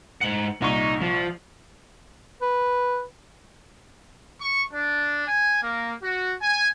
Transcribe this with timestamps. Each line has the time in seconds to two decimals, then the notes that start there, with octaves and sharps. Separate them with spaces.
0.21 G#2 F#5 C#7 F#7
0.62 C2 A#2 D#4 C#6
1.01 F3
2.42 B4
4.40 C#6
4.72 D4
5.27 G#5
5.62 A#3
6.02 F#4
6.40 G#5